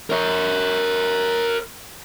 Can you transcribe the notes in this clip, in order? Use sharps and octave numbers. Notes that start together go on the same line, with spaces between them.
A#4 C#5